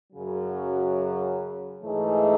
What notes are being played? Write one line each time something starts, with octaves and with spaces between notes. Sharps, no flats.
F#2 C#3 F#3
G#2 E3 A3 D#4 G#4